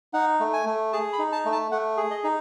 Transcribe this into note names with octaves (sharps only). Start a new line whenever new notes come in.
D#4 F#5
A3
G#5
A3
G#4 A5
B5
D#4
A5
A3
A5
A3 F#5
G#4
D#5
D#4